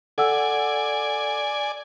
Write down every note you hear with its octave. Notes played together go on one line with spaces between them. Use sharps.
A4 D5 F#5 G#5 E6